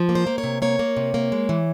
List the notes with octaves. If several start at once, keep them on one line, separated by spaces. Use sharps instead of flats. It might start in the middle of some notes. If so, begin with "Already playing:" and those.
Already playing: F3
A#3
C5
A#3
C#5
C3
A#3 C#5
A#3
C3
A#3
G#3
E3